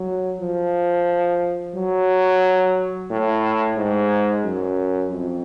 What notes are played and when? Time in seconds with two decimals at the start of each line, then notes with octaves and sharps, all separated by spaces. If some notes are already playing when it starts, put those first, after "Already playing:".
Already playing: F#3
0.41 F3
1.75 F#3
3.10 A2
3.77 G#2
4.45 F#2
5.12 F2